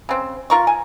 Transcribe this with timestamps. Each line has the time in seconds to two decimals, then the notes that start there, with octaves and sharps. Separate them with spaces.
0.09 C#3 C4
0.50 F4 A#4 C#6
0.67 G#5